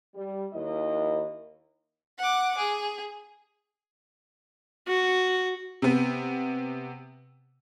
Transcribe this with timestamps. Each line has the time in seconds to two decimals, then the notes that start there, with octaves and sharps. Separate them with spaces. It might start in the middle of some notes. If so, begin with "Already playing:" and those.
0.15 G3
0.53 D#2 E4 D#5
2.18 F#5 D6
2.58 G#4
4.87 F#4
5.82 C3 B3